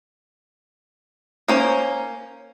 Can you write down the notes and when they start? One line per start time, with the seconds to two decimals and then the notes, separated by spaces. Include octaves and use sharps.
1.48 A#3 C#4 C5